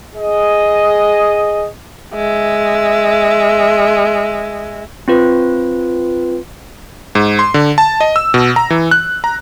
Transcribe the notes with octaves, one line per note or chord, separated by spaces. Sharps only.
G#4 D#5
G#3 E5
C4 F4 B4
G#2
C6
D3
A5
D#5
E6
B2
A#5
E3
F#6
A#5